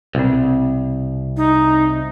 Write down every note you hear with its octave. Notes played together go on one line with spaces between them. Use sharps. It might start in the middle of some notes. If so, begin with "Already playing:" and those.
C2 B2 C4
D#4